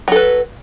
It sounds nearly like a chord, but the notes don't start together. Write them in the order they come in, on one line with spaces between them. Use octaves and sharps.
F#3 A4 B4